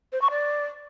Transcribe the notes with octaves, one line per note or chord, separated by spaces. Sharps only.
C5
C#6
D5